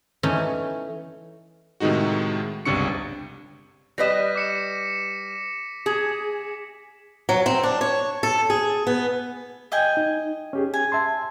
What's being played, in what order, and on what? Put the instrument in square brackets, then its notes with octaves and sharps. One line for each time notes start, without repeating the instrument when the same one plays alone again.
[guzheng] E3 A3 C#4 D#4
[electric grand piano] A2 C3 D#3 G#3 D#4 F#4
G1 C#2 C3 D4 C#6 C#7
[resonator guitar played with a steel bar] G3 B4 D#5 [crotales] A#6 B6 E7
[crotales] D6 C#7 E7
[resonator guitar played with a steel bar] G#4
[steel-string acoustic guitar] F#3
C4
D4
C#5
A4
G#4
B3
[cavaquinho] D#5 G5 G#5
[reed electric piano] D#4
C#4 G4 G#4
[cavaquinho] G#5
[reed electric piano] E5 A5 C6